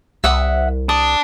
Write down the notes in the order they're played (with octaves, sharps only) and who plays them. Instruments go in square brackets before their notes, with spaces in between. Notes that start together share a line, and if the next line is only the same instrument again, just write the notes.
[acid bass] C2 [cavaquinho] E5 F#5 D#6
[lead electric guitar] D4 [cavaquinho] D#6